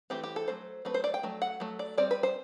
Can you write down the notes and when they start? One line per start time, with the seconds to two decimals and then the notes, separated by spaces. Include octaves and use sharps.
0.10 E3 A3 C4 G4
0.24 G4
0.36 A4
0.48 F#3 A3 C5
0.85 F#3 A3 C4 B4
0.94 C5
1.04 D5
1.14 G5
1.23 F#3 A3
1.42 F#5
1.60 F#3 A3
1.79 D5
1.98 G3 C4 D5
2.11 B4
2.23 C5